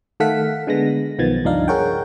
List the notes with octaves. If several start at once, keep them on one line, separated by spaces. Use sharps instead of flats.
D#3 A3 A4 F5 F#5 B6
D3 G#3 B3 A#6
B1 D#3 F3 B3 G#6 A6
C#2 G2 F3 D4 D#4 F5
G#4 A#4 C#5 F#5 G5